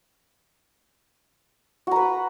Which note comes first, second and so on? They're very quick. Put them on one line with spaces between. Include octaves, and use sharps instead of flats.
F#4 A#5 B4